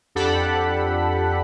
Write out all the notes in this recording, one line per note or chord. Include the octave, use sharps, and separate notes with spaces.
F2 D4 G4 A4 F#5 B5